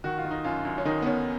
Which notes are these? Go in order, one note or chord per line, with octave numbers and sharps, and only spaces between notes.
D#3 F#4
F4
D#3
D#4
F#2 F4
F#2
C#4
D#3 D#4
B3
D#3 C#4